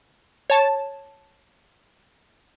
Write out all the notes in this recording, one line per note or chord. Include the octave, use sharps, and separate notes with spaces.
C#5 A5